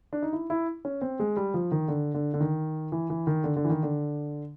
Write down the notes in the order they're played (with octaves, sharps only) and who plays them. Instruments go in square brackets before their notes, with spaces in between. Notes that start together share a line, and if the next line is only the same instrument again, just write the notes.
[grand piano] D4
D#4
E4
E4
C#4
C4
G#3
G3
F3
D#3
D3
D3
D3
D#3
E3
E3
D#3
D3
D3
E3
D#3
D3